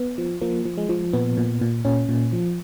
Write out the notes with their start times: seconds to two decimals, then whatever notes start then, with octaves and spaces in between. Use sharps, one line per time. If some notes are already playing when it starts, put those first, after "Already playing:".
Already playing: B3
0.18 F3
0.42 F3 A#3
0.65 F3
0.78 G#3
0.89 F3
1.13 A#2 B3
1.37 A#2
1.61 A#2
1.85 A#2 C#4
2.09 A#2
2.33 F3